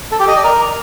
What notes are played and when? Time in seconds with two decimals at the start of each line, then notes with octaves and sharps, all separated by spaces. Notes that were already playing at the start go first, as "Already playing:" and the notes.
0.12 A4
0.20 G4
0.28 D#5
0.36 D5
0.44 A#4